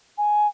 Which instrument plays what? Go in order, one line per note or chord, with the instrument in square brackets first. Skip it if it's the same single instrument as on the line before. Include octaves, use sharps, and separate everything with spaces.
[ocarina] G#5